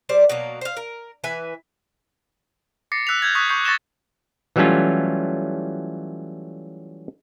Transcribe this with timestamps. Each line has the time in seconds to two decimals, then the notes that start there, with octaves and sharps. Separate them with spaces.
0.09 G3 C5 D5
0.30 B2 F#3 A#3
0.61 C5 F5
0.77 A#4
1.24 E3 B4 E5 G#5
2.92 D6 A6 A#6 C7 C#7
3.07 E6 F#6 B6 F7
3.22 F6 G6 G#6
3.35 C#6 D#6 F#6 A6 B6 F7
3.49 C#6 G6 C7
3.65 C#6 A6 A#6 C#7 E7 G7
4.56 E3 F#3 G3 A3 C#4 F4